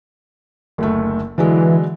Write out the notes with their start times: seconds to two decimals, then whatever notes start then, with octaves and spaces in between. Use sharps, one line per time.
0.78 F#1 D2 A3
1.38 D3 E3 F#3 G#3